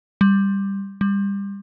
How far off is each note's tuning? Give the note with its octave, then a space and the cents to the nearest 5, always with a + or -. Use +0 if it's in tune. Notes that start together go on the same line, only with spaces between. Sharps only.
G3 +10
G3 +25